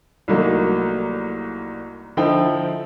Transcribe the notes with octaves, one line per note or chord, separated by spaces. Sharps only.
C2 D#3 F#3 A3 A#3
D3 F3 D#4 E4 G5